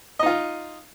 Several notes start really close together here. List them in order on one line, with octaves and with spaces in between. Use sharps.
D#5 D#4 F4